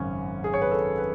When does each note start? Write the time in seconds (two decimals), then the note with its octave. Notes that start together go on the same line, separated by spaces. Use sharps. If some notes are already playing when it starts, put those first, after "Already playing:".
Already playing: G#1 F#2 C#3 C#4
0.44 G#4
0.54 C#5
0.62 B4
0.71 A4
0.98 B4